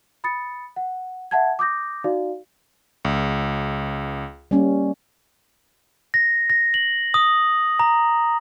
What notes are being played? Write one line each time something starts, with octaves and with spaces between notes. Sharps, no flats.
B5 D#6 A6 C#7
F#5
E5 F#5 A5 G#6
D6 D#6 G6 A#6
D#4 F#4 D5 F5
C#2
G3 A#3 C#4
A#6
A#6
F#7
D#6
A#5